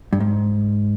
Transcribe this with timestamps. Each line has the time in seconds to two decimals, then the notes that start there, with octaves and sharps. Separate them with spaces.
0.13 G2
0.20 G#2